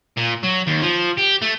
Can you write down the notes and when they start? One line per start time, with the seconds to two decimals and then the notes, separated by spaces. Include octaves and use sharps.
0.17 A#2
0.43 F#3
0.67 D#2
0.82 F3
1.18 G4
1.42 A3